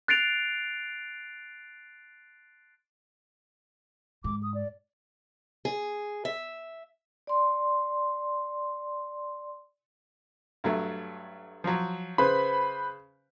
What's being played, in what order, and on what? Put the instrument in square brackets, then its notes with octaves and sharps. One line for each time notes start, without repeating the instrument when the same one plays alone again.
[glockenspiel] F#6 A6 C7 D7 F7
[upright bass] G#2 [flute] D6
[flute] D#6
D5
[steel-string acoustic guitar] G#4
E5
[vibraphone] D5 C6
[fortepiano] G2 F#3 A3
F3 F#3
[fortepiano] C#3 [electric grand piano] B4 C5 B5